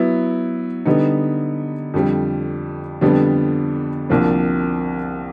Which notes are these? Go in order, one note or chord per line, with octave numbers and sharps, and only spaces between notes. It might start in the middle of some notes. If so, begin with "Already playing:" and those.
Already playing: F#3 B3 E4
D3 G3 B3 D#4
F2 D3 G3
F2 D3 G3 B3 D4
C2 C3 F3 A#3 D4